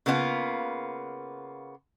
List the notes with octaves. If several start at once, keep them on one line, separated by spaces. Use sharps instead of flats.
C#3 A#3 B3 D4 F4